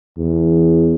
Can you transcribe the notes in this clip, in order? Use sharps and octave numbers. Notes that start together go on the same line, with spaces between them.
E2